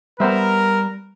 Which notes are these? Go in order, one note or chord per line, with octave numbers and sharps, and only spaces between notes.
G3 B3 A#4 C5 E5